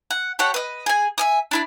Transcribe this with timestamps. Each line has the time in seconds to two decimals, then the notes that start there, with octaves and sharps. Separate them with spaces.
0.11 F#5
0.39 G4 A4 C#5 F#5
0.54 B4 D#5
0.86 G#4 G#5
1.18 E5 G#5 D#6
1.51 D4 E4 D5